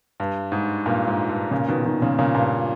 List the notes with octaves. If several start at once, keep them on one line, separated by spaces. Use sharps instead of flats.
G2
G#2
G2 A#2
G#2
G2
A#2 C#3
B2 D#3
B2 D#3
A#2 C#3
A#2 C#3
G2 A#2